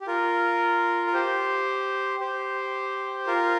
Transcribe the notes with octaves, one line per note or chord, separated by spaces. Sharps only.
G4
F4 A#4
A#4
G4 C5
G4 C5
F4 A#4